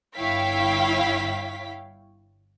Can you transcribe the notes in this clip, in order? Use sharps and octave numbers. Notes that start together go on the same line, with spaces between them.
G1 E4 C#5 F5 G5 B6